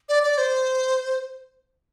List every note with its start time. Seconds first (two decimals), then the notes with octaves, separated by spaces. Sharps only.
0.09 D5
0.23 D5
0.38 C5